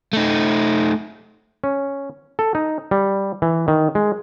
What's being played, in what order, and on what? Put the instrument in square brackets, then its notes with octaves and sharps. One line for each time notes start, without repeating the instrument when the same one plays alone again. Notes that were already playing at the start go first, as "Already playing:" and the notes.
[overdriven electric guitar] A3 D#4
[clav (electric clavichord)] C#4
A4
D#4
G3
E3
D#3
G#3